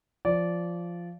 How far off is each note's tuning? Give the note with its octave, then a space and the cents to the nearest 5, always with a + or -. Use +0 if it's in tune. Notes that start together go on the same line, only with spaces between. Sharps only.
F3 -10 D5 -15